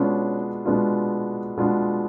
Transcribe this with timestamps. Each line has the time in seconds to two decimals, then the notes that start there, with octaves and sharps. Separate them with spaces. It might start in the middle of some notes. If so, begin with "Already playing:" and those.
Already playing: B2 G#3 B3 C#4 D4 F4
0.65 B2 G#3 B3 D4 F4
1.58 B2 G#3 B3 D4 F4